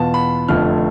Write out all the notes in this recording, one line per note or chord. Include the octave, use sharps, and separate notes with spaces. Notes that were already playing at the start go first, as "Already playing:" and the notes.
Already playing: E2 B2 B3 F4 A5
B5
F1 F2 D3 F3 A3 F6